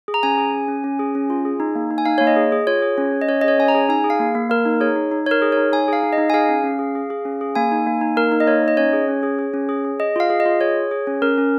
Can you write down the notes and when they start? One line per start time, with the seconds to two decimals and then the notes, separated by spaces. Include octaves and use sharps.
0.08 G#4
0.14 A#5
0.23 C#4 G#5
0.38 G#4
0.54 C#4
0.68 C#4
0.84 C#4
0.99 G#4
1.15 C#4
1.30 F4
1.45 G#4
1.60 D#4
1.75 A#3
1.91 D#4
1.98 G#5
2.06 D#4 F5
2.18 A#3 C#5
2.27 D#5
2.36 G#4
2.52 G#4
2.67 F4 C#5
2.82 G#4
2.98 C#4
3.13 C#4
3.22 D#5
3.28 C#4 C#5
3.41 D#5
3.44 G#4 C#5
3.58 C#4 G#5
3.68 A#5
3.75 G#4
3.89 D#4 G#5
4.04 G#4
4.10 F5
4.19 A#3
4.35 A#3
4.50 A#3 A#4
4.66 D#4
4.80 G#4 C#5
4.96 D#4
5.12 D#4
5.26 D#4 C#5
5.31 A#4
5.42 G#4
5.52 D#4 C#5
5.72 D#4 G#5
5.88 G#4 F5
6.03 D#4
6.13 D#5
6.18 D#4
6.30 G#5
6.34 G#4 F5
6.49 C#4
6.64 C#4
6.79 G#4
6.95 G#4
7.10 G#4
7.25 C#4
7.41 G#4
7.55 A#3 G#5
7.72 D#4
7.87 A#3
8.01 D#4
8.16 A#3 A#4
8.32 D#4
8.40 D#5
8.47 A#3 C#5
8.63 D#4
8.68 D#5
8.77 C#4 C#5
8.93 G#4
9.08 C#4
9.23 G#4
9.39 G#4
9.54 C#4
9.69 G#4
9.85 G#4
10.00 G#4 D#5
10.16 F4 F5
10.30 G#4
10.40 D#5
10.46 F4
10.61 G#4 C#5
10.76 G#4
10.91 G#4
11.07 C#4
11.22 C#4 A#4
11.38 C#4